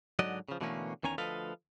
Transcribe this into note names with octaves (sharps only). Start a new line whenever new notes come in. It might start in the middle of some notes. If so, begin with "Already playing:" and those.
G#2 D3 F#3 F#4 D5 D#5
C#3 F3
B2 D3 E3 A3 A#3 C#4
E2 D#3 C#4 G#5 A#5
D2 F3 A4 B4 D#5 F5